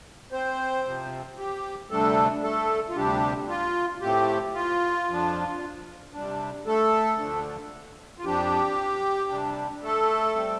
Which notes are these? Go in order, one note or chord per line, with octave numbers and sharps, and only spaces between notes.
C4 C5
C3 F3 C4
G4
D2 C3 G3 A3 D4 A4
A3 A4
F4
D2 C3 G3 D4 G4
F4
A2 A3 C4 G4
F4
F2 F3 D4
C3 G3 D4
A3 A4
D2 D3 F3 A3 D4
F4
F2 F3 D4 G4
C3 G3 D4
A3 A4
G3 C4